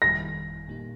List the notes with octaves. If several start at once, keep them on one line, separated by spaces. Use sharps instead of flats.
G1 F2 D#3 G3 A#6
A#2 G3 A#3 D#4